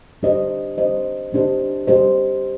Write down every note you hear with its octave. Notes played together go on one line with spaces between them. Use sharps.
G3 D4 G4 C5 D#5
G3 D4 G4 C5 D#5
G3 D4 G4 C5 D#5
G3 D4 G4 C5 D#5